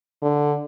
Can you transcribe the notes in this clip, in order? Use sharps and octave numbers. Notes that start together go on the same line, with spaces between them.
D3